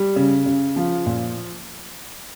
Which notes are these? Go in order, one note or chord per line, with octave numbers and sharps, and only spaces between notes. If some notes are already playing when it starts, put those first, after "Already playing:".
Already playing: G3
C#3
C#3
F3
A#2